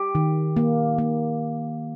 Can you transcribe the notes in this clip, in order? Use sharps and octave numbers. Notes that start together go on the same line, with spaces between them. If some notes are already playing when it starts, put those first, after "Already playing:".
Already playing: G4
D#3
A#3
A#3